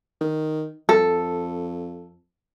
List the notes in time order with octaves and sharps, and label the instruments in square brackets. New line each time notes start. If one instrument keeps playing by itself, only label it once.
[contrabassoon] D#3
[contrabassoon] F2 [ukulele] A4